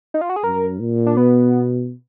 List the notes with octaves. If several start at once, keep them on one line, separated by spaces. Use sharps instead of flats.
D#4
F4
F#4
G#4
F#2 A#4
A#2
D4
B2 B3